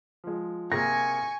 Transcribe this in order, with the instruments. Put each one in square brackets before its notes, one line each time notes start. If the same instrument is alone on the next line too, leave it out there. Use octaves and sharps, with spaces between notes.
[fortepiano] F3 G#3
[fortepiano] C3 A#3 G#4 [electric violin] G#5 C#6 [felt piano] A#6